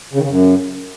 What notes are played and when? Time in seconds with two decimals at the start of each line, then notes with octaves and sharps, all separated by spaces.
0.13 C#3
0.19 D#3
0.24 C#3
0.29 F#2